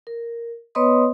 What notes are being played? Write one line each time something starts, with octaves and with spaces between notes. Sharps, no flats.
A#4
B3 B4 C#5 D#5 C6 D#6